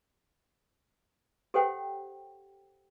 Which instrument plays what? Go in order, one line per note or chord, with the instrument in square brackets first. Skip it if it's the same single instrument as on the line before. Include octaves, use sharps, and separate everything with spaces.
[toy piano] G4 A4 C5 C#5 F#5 G5